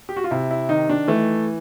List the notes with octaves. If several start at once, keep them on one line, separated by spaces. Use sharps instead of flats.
G4
F#4
F4
C3 E4
E4
D#3 D#4
D4
E3 A3